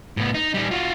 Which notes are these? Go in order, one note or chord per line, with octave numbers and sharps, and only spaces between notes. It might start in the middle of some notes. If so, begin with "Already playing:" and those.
A2 B3
D#4
G3 D#4
F4 F#4